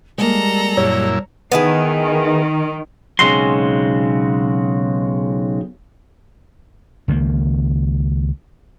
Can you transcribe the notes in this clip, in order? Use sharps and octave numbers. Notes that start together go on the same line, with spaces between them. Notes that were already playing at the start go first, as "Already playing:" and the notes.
G3 G#3 A#3 A4 A#5
F#2 A#2 E4 C#5
D#3 B3 E4 G#4
B1 C#3 G#3 C4 F#4 C6
C#2 D#3 E3 A#3